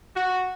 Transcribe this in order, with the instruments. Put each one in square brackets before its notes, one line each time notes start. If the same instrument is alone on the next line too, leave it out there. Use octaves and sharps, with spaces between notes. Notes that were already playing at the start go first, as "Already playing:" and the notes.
[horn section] F#4